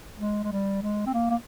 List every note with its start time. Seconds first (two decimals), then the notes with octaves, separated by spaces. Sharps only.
0.20 G#3
0.44 G#3
0.52 G3
0.83 G#3
1.07 C4
1.14 A#3
1.31 A#3